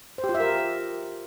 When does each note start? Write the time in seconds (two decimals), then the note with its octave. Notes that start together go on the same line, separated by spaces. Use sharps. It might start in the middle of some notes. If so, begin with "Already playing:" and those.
0.18 C5
0.24 G4
0.29 F4
0.35 E5
0.40 A#4